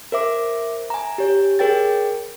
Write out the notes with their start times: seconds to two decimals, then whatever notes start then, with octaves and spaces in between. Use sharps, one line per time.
0.12 A#4 C5 E5 D6
0.90 G#5 A#5
1.18 G4 C#5
1.59 G#4 A#4 C#5 G5 A6